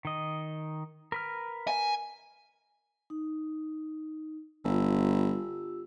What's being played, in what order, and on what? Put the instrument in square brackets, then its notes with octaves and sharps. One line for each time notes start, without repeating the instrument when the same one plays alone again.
[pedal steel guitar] D#3 D#5
A#4 B4 F6
[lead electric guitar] G#5
[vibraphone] D#4
[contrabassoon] G1 [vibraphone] F4 G4 E6